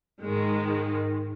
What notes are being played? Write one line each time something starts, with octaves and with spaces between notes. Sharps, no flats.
G#2 D#3 G#3